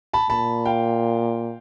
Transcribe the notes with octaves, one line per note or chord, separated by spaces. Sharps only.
A5 B5
A#2 A5 B5
F5 G5